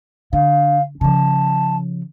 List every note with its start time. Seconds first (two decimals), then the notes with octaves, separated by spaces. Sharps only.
0.33 D3 F5
1.01 C#3 F3 A5